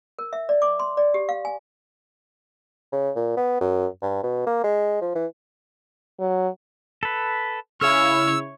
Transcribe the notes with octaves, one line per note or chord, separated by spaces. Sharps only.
A#4
E5
D5
D6
C6
D5
G4
F5
G#5
C#3
A#2
B3
F#2
G2
B2
A#3
G#3
F3
E3
F#3
A4 B4
C#3 E4 C#5 E6 F6